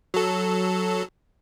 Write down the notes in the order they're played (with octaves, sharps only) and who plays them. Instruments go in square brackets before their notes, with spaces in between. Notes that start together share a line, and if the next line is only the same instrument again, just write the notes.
[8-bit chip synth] F#3 A4